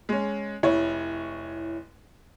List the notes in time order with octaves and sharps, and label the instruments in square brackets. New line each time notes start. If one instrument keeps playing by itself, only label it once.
[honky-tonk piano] G#3 C#4
[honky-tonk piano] F1 C#5 [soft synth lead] E4